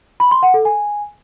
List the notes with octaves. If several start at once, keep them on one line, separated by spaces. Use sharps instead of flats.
B5
C6
F#5
A4
G#5